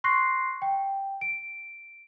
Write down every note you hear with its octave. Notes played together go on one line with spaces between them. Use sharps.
C6 C#6 F#6 A#6 C7
G5
D7